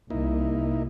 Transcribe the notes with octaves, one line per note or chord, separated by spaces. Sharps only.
C2 A#3 D#4 E4